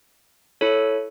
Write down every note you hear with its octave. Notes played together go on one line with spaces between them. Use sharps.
E4 A4 C#5